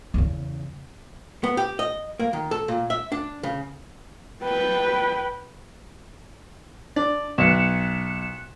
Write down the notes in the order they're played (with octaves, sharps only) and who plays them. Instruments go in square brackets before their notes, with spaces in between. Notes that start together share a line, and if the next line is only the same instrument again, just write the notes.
[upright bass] E2 C#3
[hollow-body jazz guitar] B3
G4
D#5
A#3
D#3
A4
A#2
E5
D4
C#3
[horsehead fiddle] B4 G5
[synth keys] D4 [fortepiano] D5
[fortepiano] B1 [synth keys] F#6 C#7 E7